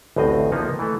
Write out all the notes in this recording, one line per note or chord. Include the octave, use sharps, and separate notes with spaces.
A1 D2 A2 C4 D#5
F3 A#3 B3 D#4
E3 A3